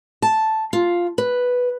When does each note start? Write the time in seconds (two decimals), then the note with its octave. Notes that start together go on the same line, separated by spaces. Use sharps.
0.22 A5
0.73 F4
1.18 B4